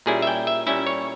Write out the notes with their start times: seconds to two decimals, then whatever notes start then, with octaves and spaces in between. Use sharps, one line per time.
0.06 A#2 G3 C#4 E4 G#4
0.22 E5
0.27 G5
0.47 E5
0.67 A#2 G3 C#4 E4 E5
0.87 C#5